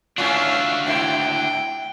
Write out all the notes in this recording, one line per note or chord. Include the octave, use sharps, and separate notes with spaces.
G#2 C#4 D4 F4 F#4 E5 F5
G#2 C4 E4 G5